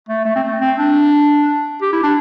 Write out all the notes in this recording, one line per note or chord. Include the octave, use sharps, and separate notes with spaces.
A3
A3
C4
A3
C4
D4
G4
E4
D4